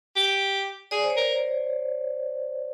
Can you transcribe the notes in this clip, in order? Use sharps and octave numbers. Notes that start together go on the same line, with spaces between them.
G4
G#4 D5
C5
C#5
A#4